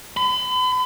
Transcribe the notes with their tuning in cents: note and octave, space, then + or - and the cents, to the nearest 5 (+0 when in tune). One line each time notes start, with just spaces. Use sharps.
B5 +40